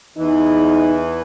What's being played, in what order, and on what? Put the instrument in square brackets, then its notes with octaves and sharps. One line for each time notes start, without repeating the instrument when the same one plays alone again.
[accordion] E2 E3 [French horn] D#4